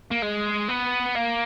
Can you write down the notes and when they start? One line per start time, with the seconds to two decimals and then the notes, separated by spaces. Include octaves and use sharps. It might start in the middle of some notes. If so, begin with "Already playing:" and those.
0.11 A#3
0.23 G#3
0.69 B3
1.16 A#3